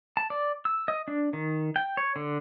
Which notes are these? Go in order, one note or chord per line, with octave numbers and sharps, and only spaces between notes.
A5
D5
E6
D#5
D4
D#3
G5
C#5
D3